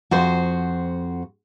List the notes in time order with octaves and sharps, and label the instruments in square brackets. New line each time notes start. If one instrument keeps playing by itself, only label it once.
[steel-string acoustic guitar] F2 F#4 C5